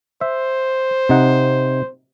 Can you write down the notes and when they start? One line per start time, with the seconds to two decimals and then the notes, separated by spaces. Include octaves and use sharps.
0.21 C5 E5
1.09 C3 D#4 F#5